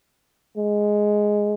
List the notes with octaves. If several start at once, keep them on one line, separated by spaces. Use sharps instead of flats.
G#3